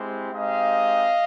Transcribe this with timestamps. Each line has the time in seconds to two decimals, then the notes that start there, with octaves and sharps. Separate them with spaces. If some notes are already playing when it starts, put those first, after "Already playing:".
Already playing: G#3 C4 E4 G4
0.32 G#3 C4 D#4 G4 D#5 F5